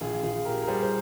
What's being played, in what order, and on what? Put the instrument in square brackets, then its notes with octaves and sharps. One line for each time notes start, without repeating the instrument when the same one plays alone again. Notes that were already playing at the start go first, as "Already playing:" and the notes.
[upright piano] A#1 F4 G#4
A#1 F4 G#4
A#2 G4 A#4
A#4
G3 G#4 C5
C5